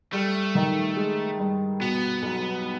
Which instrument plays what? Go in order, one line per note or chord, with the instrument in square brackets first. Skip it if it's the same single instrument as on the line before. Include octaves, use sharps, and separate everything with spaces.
[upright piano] G3 [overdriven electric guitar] A3
[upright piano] D#3
G#3
G2
[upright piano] B2 [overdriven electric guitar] B3
[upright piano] B1